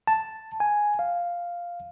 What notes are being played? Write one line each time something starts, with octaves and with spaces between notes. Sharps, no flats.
A5
G#5
F5